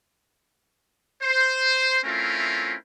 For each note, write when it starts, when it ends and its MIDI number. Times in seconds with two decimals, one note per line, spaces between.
1.22 1.98 72
2.04 2.75 57
2.04 2.75 60
2.04 2.75 61
2.04 2.75 64
2.04 2.75 65
2.04 2.75 70